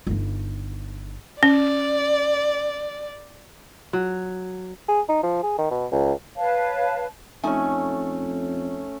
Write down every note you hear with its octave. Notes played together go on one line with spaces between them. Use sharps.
G1 D#4
C#4 D5
F#3
G#4
D#4
F3
G#4
D#3
B2
C#2
B4 C#5 F5 A5
F2 A3 C#4 D#4 G#5